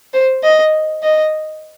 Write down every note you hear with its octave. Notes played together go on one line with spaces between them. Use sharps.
C5
D#5
D#5